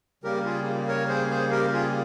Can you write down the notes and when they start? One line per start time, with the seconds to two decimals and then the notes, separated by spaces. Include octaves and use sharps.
0.24 C#3 G3 A#3 G4 A#4
0.45 F4 G#4
0.88 A#4 C#5
1.08 G#4 C5
1.30 G#4 C5
1.51 G4 A#4
1.73 F4 G#4